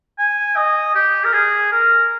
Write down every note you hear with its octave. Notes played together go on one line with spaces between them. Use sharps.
G#5
D#5
G4
A#4
G#4
A#4